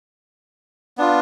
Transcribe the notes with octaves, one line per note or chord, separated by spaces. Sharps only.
B3 D4 F4